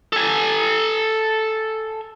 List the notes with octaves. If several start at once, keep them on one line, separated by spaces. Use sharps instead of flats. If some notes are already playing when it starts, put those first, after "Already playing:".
A4 G#5